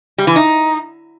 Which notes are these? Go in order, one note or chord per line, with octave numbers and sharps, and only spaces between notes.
G3
E3
D#4